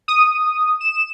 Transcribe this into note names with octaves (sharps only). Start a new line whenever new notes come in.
D#6
E7